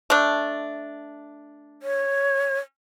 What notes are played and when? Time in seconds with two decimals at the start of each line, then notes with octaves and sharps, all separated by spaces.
0.10 A3 D4
1.82 C#5